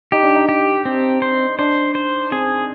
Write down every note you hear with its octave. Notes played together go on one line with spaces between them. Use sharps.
D#4 G4
D4
D#4
G4
C4
C5
D4 C5
C5
C4 G#4